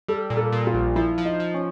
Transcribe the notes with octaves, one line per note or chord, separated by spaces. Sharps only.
G3 A4
A#2
A4
A#2
F4
A#1
F3 E4
F3
D#4
F3
C#4